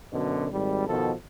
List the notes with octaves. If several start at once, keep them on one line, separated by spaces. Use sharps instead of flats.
F#2 B2 D3
G#1 G3
B2 D#3 F3 A4